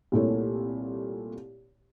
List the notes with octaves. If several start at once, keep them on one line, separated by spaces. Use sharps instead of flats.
C2 A#2 A3 E4 C#5